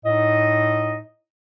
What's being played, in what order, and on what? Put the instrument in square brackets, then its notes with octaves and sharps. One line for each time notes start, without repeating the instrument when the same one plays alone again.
[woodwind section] A2 D#4 D#5